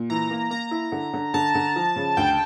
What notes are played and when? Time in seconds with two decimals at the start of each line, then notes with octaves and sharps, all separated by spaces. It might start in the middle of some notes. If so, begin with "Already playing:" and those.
Already playing: A#2
0.10 E3 A#5
0.31 A#3
0.51 A#3 A#5
0.71 E4
0.92 D3
1.13 D3
1.34 D3 A5
1.55 D3
1.76 F3
1.96 C#3
2.17 D2 G5